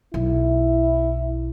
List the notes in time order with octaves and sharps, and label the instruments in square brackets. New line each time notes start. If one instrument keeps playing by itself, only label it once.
[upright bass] B1 [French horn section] E4